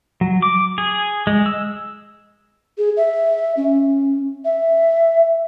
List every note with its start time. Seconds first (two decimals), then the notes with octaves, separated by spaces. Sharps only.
0.21 F#3
0.42 D6
0.78 G#4
1.27 G#3
1.46 E6
2.78 G#4
2.97 E5
3.57 C#4
4.45 E5